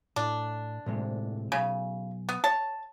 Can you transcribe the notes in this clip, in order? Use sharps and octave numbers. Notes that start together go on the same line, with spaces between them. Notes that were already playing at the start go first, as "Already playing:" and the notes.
A2 D4
A2 C3 G#3
B1 C#3 G#5 B5
B3
C#5 A5